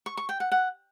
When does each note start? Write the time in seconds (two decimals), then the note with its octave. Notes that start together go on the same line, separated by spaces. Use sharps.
0.06 C#6
0.17 C#6
0.29 G5
0.40 F#5
0.52 F#5